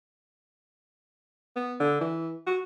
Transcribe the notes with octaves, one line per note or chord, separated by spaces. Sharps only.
B3
D3
E3
F#4